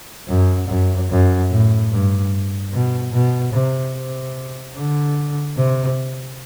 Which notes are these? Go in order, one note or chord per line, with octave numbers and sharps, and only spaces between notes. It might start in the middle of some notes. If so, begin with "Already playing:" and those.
F#2
F#2
F#2
A2
G2
B2
B2
C3
C3
D3
C3